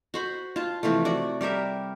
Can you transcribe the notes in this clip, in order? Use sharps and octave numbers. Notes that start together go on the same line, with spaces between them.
F#4 C5 B5
F4 A5
C3 E3 F3 A3
F#4 D5
G3 G4 A#4 E5